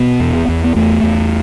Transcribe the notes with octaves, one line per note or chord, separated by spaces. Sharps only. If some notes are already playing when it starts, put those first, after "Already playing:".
Already playing: B2 B3
E2
E2
B3
E2 A3
E2